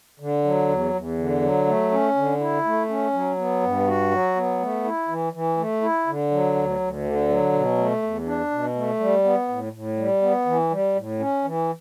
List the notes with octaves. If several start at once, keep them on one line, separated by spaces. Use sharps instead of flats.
D3
F#3
E2
E2
D3
F#3
A3
C#4
D3
E4
A3
C#4
F#3
B3
G2
F#4
F#3
B3
A3
E4
E3
E3
A3
E4
D3
F#3
D2
D2
D3
F#3
B2
A3
E2
D4
B2
A3
G3
B3
A2
A2
G3
B3
E3
G3
A2
C#4
E3